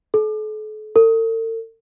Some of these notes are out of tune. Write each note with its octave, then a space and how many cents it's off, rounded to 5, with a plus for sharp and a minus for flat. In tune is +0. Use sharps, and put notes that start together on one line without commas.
A4 -40
A4 +45